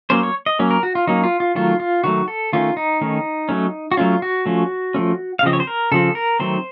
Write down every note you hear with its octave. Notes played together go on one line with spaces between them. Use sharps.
F#3 A#3 C#4 C5
C#5
D#5
F#3 A#3 C#4
A#4
F#4
F4
F#3 A#3 C#4 D#4
F4
F4
D#3 F#3 A3 F4
F4
D#3 F#3 A3 F#4
A4
D#3 A3 C#4 F4
D#4
D#3 A3 C#4
F#3 A3 C#4
F#4
F#3 A3 C#4 F4
F#4
F3 A3 C#4
F3 A3 C#4
F5
C#3 F3 C4 D#5
C#5
C5
A#4
C#3 F3 C4 A4
A#4
D#3 F#3 A3 C4 C5